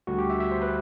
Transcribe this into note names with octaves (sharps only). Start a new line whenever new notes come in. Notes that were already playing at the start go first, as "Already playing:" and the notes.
D2 D3 G3 F#4
G4
E5
E5
C5
B4